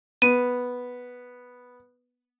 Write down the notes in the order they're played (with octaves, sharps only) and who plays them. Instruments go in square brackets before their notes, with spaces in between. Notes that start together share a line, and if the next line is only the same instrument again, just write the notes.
[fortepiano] B3 [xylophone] D#7